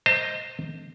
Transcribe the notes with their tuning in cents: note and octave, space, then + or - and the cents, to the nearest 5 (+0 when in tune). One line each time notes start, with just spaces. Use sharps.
C5 +0 D#5 +0 A5 +45